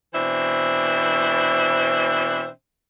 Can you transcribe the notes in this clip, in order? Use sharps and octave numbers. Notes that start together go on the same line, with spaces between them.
B2 E3 C4 D4 C5 E5